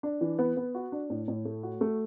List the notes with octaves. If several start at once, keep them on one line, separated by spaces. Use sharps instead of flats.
D4
E3
B3
B3
F#4
D4
A2
A2
A3
F#4
A3